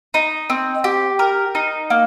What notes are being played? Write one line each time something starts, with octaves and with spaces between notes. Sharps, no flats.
D#4
C4
G4
A#4
D#4
A#3